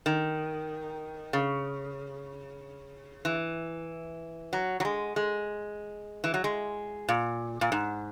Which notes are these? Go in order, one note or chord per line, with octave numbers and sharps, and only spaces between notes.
D#3
C#3
E3
F#3
F#3
G#3
G#3
E3
F#3
G#3
A#2
A#2
G#2